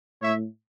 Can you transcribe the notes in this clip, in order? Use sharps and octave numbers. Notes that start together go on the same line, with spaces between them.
A2 C#5 E5